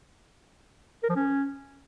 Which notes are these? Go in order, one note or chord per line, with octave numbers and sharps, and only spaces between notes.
A#4
F3
C#4